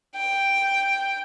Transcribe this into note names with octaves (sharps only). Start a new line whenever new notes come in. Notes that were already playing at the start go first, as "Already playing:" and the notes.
G5